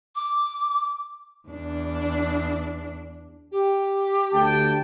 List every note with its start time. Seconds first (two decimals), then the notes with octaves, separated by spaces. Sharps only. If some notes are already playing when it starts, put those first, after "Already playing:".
0.16 D6
1.48 E2 D4
3.52 G4
4.32 D2 G5 A5